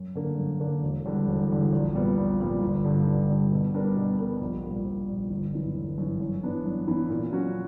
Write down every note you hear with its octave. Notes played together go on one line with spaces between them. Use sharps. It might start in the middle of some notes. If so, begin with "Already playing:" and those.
Already playing: F#2
D3 A#3 D4
F#2
D3 A#3 D4
E1
E2 D3 G3
E1
E2 D3 G3
A#1
A#2 G3 B3
A#1
A#2 G3 B3
G1
G2 D3 G3
G1
G2 D3 G3
B2
G3 B3 D4 A#4
B2
G3 B3 D4 A#4
A#1
A#2 G3
A#1
A#2 G3
G1
F#2 E3
G1
F#2 E3
F#2
E3 B3 D4
F#2
E3 B3 D4
A#2
F#3 C#4 F#4